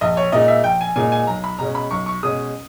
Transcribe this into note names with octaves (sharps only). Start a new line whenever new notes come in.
A#1 D#5
C#5
A#2 G#3 D#4 D#5
E5
A#1 G5
G#5
A#2 G#3 D#4 G#5
G#5
B1 A#5
B5
B2 G#3 C#4 A#5
B5
B1 C#6
C#6
B2 G#3 C#4 D#6